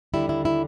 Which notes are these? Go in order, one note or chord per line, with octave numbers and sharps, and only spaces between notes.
D#2 D3 G3 E4
E4
E4